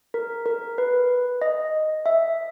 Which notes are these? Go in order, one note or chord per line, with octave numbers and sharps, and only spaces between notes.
A#4
A#4
B4
D#5
E5